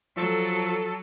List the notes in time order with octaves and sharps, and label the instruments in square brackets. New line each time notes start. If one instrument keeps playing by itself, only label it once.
[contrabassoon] F3 [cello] F#3 [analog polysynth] A4